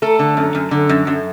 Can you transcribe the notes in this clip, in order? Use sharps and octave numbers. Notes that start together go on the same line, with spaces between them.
A3 A4
D3
F#2
F#2
D3
F#2
F#2